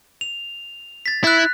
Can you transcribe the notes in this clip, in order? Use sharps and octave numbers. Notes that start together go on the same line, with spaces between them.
F7
A6 B6
E4 F#6 B6